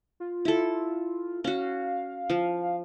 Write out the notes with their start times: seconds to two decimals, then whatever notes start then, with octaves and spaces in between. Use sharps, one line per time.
0.20 F4
0.45 E4 A4
1.44 C#4 F#4 F5
2.30 F3